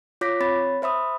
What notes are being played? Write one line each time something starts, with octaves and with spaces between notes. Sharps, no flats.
F4 C#5 D6 G6 A#6 B6
C4 C#5 B5 A6
C5 E5 B5 D#6